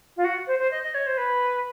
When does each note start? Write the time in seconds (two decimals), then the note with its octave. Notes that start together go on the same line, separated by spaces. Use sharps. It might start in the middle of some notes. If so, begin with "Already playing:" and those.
0.17 F4
0.24 F#4
0.47 C5
0.59 C5
0.71 D#5
0.83 D#5
0.94 C#5
1.06 C5
1.17 B4